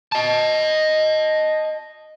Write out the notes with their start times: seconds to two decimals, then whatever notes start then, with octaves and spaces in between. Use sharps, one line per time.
0.12 D#5 A5